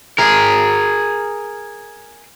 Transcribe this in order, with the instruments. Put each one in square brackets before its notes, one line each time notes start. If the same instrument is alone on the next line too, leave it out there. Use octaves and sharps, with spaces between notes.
[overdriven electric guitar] G#4 A#4